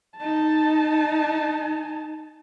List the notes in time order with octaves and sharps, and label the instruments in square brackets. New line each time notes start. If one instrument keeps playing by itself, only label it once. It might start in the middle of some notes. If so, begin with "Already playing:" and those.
[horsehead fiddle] D#4 A5